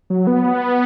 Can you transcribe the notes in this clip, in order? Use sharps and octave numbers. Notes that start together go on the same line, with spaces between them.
F#3
B3